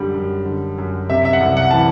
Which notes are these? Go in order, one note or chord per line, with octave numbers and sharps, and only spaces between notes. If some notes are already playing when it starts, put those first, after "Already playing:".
Already playing: F#2 D3 G3
F#2
D3
F#2
C3 E5
E5
F#5
C2
F#5
E3 A5